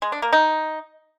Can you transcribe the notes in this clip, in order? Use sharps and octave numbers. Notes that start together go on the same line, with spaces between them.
G#3
D4
A#3
D#4